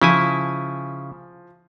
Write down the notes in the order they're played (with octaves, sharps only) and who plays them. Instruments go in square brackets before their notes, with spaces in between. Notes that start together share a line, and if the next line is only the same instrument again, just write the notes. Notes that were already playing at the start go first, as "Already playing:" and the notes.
[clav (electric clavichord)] C#3 E4 G#5 [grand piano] F3